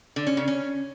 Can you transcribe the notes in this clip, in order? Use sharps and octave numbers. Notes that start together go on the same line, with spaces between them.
D3
C#4
C#3
C#4